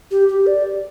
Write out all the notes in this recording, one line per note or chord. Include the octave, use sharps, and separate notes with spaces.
G4
G4
D5